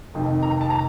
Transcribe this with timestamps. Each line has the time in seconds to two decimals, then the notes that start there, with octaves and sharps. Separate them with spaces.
0.14 F1 F2 D#3
0.43 A#5
0.61 A5
0.70 A#5